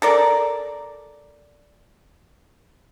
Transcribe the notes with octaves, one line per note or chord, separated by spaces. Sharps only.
A4 A#4 D5